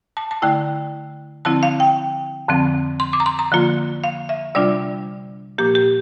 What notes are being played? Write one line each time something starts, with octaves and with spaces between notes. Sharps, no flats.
A5
A5
D3 A3 E4 G5
D3 F3 C4 E4 A5
F5
G5
F2 D3 F3 C4
C6
D6
A#5
C6
A#5
D3 F3 A#3 F4
F5
E5
C3 G3 D4 F4 D5
A#2 F3 A#3 G4
G4